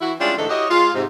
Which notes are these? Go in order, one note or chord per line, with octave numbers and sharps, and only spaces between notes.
E3 E4 F#4
G3 G#3 C#4 D4 E4 F4
G#2 D3 E3 A3 D#4 A4
E4 F#4 G4 C#5 D#5
G#3 F4
G#2 C3